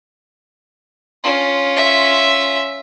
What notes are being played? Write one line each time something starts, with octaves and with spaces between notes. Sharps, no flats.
C#4 F4
E5